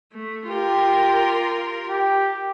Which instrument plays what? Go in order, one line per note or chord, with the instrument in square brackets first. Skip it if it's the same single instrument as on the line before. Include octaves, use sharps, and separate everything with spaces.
[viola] A3
[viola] F4 A#4 [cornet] G4
[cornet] G4